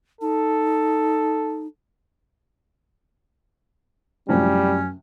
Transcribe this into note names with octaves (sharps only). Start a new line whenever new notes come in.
D#4 A4
F#2 A2 C3 F3 G3 C#4